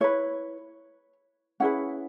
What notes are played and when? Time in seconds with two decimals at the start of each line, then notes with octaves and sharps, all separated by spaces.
0.01 E4 B4 C#5
1.60 C#4 E4 G#4 B4 F#5